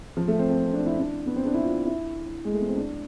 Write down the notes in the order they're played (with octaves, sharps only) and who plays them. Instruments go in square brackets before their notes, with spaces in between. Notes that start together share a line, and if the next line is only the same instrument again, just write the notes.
[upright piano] F3
A3
C4
C4
D4
E4
D4
B3
C4
D4
E4
F4
E4
G#3
A3
B3
C4
D4